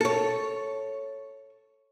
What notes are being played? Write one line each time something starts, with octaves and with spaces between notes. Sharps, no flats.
A4 C#5